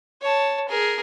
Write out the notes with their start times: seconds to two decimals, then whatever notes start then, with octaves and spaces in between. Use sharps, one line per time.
0.21 C#5 A5
0.69 G#4 A#4